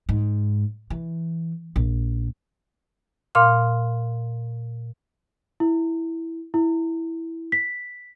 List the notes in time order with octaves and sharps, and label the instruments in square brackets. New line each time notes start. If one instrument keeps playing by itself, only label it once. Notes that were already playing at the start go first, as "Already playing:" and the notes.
[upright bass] G#2
E3
A#1
[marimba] A#2 F5 C6 F6
[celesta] E4
E4
B6